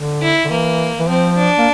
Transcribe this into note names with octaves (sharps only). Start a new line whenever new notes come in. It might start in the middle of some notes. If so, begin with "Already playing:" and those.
Already playing: D3
E4
D3
E3 A#3
E3
F3 C4
D4
A#3